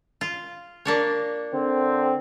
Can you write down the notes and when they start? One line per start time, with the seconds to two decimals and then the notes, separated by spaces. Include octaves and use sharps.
0.21 F4
0.85 A#3 D4 C#5
1.54 D3 C4